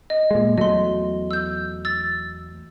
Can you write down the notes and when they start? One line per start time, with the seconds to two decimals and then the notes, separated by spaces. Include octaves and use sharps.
0.10 D#5
0.31 A#2 G#3
0.57 E2 F#3 A3 D#5 C6
1.31 E6 G6
1.85 E6 A6